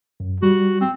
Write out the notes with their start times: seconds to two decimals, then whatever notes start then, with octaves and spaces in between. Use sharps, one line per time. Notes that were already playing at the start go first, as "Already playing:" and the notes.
0.20 F#2
0.43 G3 F#4
0.81 C4